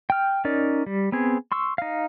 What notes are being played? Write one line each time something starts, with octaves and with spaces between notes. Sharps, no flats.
G5 F6
C#4 D#4 A#4 D5
G3
B3 C4 G#4
C6 C#6 E6
D#4 F5